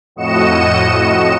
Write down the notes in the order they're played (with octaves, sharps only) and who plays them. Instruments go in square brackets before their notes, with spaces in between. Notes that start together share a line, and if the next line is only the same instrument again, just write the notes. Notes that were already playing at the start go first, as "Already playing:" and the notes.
[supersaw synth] F2 A2 F#4 D#5 C#7 E7